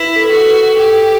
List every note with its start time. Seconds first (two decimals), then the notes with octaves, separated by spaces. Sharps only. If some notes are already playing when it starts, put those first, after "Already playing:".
Already playing: E4 B4
0.16 A4
0.24 B4
0.31 F#4 A4
0.47 B4
0.77 G4 A4